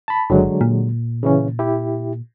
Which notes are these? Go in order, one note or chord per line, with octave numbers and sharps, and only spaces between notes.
A5 B5
F#1 D3 F#3 G#3
A#2
C#3 E3 C#4
E4 G4